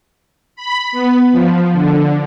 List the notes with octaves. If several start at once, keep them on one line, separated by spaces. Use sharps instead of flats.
B5
B3
F3
D3